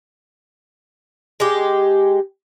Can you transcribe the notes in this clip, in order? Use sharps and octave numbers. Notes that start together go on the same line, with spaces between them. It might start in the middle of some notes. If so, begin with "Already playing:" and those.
G#3 G4